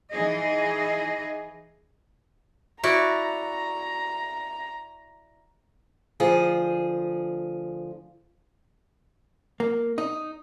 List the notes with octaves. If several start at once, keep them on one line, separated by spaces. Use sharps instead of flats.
E3 D#4 G#4 D#5
E4 F#4 D5 A#5
D2 F3 G#4
A#3
D#4